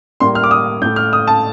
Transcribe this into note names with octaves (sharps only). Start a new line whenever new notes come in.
A2 G3 A#3 C6
F6
D6
D#6
A2 A3 G6
F6
D#6
A5